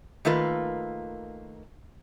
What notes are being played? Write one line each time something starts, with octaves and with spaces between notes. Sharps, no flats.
D#3 A3 A#3 F4 B4